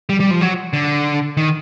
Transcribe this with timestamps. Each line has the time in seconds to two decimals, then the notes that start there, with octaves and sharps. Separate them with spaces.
0.09 G3
0.20 G3
0.31 F3
0.41 F#3
0.73 D3
1.37 D#3